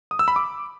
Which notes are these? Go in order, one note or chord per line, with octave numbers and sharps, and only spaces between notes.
D#6
E6
B5
D6